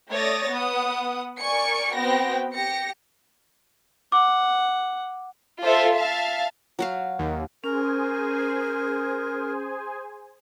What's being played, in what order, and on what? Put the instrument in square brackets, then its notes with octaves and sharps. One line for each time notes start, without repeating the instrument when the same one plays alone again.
[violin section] A3 C#5 D5 D#6 A6 A#6
B3 F#5 D#6
A#4 D5 G#5 C#6 C#7
B3 C4 F#4 G5 A#6
G4 A#6 C#7
[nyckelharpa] F#5 [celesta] D6
[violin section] F4 A4 C5 E5
E5 F5 A5
[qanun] F#3 F#4 F5
[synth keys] D#2
[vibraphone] C#4 [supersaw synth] G#4 C5 G#5 [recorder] A#4